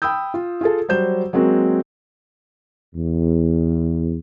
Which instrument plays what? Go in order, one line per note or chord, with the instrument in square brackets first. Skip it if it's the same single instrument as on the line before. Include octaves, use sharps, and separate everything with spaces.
[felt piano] G5 B5 D#6 E6 G6
F4
F4 G#4 A4
F#3 G3 C5 G6 E7
F#3 G#3 A#3 C4 F#4
[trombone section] E2